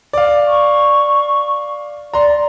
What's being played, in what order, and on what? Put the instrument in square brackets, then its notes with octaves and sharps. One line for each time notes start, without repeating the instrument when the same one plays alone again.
[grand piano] D5 F5
[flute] C#6
[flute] D5 [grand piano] A#5 C6